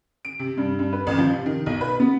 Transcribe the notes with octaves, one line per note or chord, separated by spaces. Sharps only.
D7
C3
G2
G2
B4
A1
F3
C3
D#3
B1
B4
B3